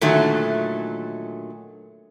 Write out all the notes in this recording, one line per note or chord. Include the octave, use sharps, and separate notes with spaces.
A#2 D3 D#3 F#3 A3